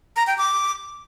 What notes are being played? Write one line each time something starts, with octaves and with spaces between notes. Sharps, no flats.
A#5
G5
D6